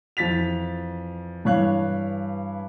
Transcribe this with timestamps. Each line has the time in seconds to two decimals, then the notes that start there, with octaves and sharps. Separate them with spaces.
0.17 F2 E3 A6 B6 F7
1.45 G2 E3 C#5 F5 F#6